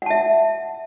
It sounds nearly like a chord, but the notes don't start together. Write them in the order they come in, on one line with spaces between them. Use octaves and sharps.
F#5 A5 E5